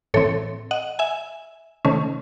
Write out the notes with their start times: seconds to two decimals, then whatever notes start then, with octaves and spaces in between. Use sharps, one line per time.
0.14 A2 E3 C4 A4 C#5
0.71 D#5 F#5
0.99 E5 G#5
1.85 C3 D#3 A3 C#4